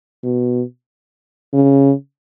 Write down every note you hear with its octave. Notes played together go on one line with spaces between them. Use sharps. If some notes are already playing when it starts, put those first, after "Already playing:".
B2
C#3